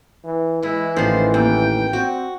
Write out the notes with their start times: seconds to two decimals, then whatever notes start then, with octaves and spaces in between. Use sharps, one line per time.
0.25 E3
0.63 E3 G#3 E4
0.96 A1 D#3 F3 C5
1.34 D#2 G5
1.93 C4 F#4